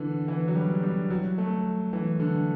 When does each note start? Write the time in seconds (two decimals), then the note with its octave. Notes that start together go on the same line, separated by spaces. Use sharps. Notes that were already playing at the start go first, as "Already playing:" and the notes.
Already playing: D3 E3
0.28 E3
0.48 F#3
0.55 G3
0.83 G3
1.10 F#3
1.38 A3
1.93 E3
2.20 D3